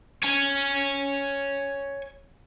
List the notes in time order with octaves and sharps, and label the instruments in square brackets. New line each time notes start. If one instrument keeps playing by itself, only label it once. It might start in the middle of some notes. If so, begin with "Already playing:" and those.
[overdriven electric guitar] C#5 G#5